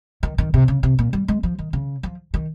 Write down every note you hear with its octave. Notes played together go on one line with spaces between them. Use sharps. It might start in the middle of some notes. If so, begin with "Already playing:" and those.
D#3
D#3
C3
C#3
C3
A#2
G3
G#3
F3
D#3
C#3
F3
D#3